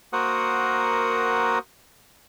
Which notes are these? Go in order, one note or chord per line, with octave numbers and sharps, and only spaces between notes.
A#3 F#4 A#4 C5 F#5 D#6